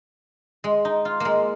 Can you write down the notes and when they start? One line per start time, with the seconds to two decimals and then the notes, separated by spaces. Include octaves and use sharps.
0.64 G#3
0.85 D#4
1.05 F4
1.20 G#3 A#3